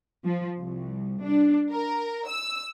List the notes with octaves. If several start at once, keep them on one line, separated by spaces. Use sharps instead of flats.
F3
C2
D4
A#4
E6